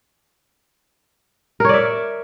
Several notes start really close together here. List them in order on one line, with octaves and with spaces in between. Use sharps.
A#4 C#5 D5 E5